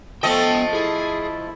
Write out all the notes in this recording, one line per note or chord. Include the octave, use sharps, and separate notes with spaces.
F3 A3 B3 A4 D#5 G5
E4 G#4